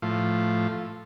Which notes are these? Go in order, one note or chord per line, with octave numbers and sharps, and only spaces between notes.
A2 F3